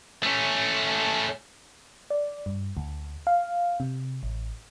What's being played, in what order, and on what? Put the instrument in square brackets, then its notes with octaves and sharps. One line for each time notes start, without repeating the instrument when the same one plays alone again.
[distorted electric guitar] A3 C#4
[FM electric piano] D5
G2
D2
F5
C3
A1